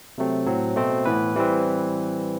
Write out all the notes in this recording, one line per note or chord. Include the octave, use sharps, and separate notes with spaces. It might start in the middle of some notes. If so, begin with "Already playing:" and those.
C3 F#3 A3 C4
A2 F#3 C4
B2 A3 C4
A2 E3 B3 B4
E3 G3 C4